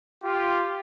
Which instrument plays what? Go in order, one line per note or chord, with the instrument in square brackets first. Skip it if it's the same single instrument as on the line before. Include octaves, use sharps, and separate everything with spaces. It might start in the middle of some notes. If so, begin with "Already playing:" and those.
[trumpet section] F4 G4